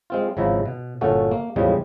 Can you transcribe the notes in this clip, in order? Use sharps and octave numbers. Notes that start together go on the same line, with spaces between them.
G#3 C4 F4
G#1 C#3 F3 E4 A#5
B2
G1 A#2 A3 C#4 F#4 A4
A#3
E2 A2 C#3 F3 G3 G#3